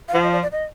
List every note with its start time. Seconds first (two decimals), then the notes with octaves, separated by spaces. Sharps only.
0.08 F5
0.13 F3 F#5
0.23 D#5
0.32 D5
0.42 D5
0.52 D#5